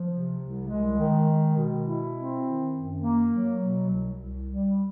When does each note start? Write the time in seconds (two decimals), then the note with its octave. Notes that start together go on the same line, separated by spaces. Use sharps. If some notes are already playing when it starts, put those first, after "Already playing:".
Already playing: F3
0.10 C3
0.39 C2
0.68 G#3
0.97 D#3
1.26 G#3
1.55 B2
1.85 E4
2.14 C4
2.43 D#3
2.72 F#2
3.01 A#3
3.31 F#3
3.60 B2
3.89 C2
4.18 C2
4.47 G3